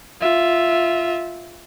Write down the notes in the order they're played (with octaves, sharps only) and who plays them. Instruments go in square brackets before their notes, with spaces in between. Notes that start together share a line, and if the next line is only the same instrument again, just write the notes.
[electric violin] F4 E5